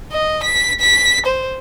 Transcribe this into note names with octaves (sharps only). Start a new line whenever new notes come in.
D#5
B6
B6
C5